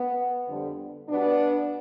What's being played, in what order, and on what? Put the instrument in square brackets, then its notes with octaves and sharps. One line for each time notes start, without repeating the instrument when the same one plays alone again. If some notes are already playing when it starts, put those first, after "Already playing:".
Already playing: [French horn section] B3
F2 D3 G3
B2 G3 B3 D4